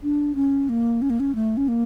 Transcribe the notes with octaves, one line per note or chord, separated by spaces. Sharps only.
D4
C#4
A#3
C#4
A#3
C#4
A3
C#4
A#3